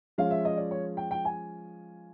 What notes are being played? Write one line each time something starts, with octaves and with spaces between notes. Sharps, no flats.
F3 G#3 C#4 F5
E5
D#5
D5
C#5
G5
G5
G#5